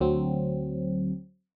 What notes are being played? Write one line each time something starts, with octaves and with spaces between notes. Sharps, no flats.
D2 F#3 C4